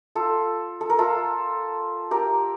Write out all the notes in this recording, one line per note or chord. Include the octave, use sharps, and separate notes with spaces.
F4 A4
A4
A#4
F4 A4
G4 A#4